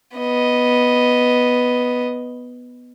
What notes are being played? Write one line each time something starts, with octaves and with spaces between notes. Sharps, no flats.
B3 D#5